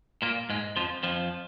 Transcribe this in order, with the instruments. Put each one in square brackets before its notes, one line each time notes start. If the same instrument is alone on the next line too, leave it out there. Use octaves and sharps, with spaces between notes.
[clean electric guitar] A#2 A#3
G#2 G#3
F2 F3
F2 F3